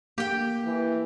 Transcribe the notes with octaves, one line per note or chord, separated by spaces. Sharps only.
A#3 G4 G5
E3